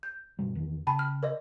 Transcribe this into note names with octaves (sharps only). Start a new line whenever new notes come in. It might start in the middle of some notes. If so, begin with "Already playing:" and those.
G6
G1 B2 G3
E2 D#3
C#3 G5 A5 B5
F6
A#4 D5 D#5